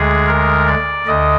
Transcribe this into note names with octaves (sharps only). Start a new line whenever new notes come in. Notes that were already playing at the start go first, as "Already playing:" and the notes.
Already playing: D2 D3 G#3 G#4
A#4
D5
D2 D3 D#5